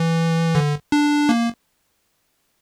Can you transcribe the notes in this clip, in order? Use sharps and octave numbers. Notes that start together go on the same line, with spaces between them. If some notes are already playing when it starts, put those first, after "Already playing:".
Already playing: E3
D3
D4
A#3